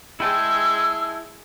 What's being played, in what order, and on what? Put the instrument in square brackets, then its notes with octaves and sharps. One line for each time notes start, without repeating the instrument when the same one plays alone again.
[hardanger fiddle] G#3 G#4 [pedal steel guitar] E4 G5 A5 [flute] E6